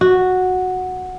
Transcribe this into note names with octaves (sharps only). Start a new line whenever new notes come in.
F#4